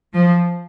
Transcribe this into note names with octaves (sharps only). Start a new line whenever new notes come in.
F3